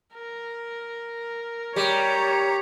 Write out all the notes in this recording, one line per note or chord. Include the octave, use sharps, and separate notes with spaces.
A#4
G3 G4 C#5 A#5